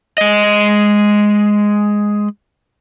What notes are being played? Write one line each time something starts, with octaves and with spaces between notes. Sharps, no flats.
G#3 D#5